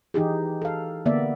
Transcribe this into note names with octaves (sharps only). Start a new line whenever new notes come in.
E3 D#4 G4 G#4
A4 F5
D3 A#3 B3 D5 E5